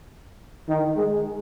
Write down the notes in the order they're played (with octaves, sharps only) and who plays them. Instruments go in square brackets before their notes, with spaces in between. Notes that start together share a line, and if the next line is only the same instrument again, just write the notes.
[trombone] D#3
G#3